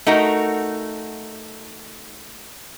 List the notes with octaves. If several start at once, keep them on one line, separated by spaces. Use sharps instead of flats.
A3 D#4 F#4 A#4